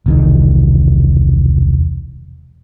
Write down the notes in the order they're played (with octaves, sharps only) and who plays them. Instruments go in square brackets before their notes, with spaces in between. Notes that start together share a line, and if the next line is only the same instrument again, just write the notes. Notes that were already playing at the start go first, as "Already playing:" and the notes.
[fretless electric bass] E1 C2 D#3